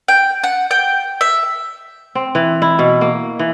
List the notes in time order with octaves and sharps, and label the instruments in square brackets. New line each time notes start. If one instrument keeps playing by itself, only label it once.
[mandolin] G5
F#5
G5
E5
[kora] C4
E3
E4
B2
A#3
E3